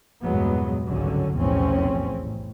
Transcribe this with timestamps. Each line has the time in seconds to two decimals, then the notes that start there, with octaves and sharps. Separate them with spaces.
0.23 E2 G2 A#2 F#3 G#3 B3
0.89 G#1 C#2 G2 D3 F#3 C#4
1.35 F1 B1 E2 A2 C4 C#4
2.21 A1